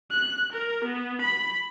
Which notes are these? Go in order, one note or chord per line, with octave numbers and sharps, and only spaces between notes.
F#6
A#4
B3
B5